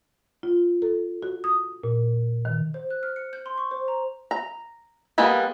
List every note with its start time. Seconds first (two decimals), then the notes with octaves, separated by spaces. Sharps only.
0.43 F4
0.82 A4
1.23 F#4
1.44 D#6
1.84 A#2
2.45 D#3
2.74 C5
2.91 F#6
3.03 F6
3.16 C#7
3.33 G6
3.46 C6
3.58 C#6
3.71 C5
3.88 A#5
4.31 A#5
5.18 G3 G#3 A#3 B3